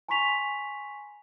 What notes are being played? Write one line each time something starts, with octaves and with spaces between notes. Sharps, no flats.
G#5 A#5 C6 C#6 B6 F7